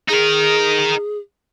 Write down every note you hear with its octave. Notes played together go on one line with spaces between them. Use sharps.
D#4 G#4 A#4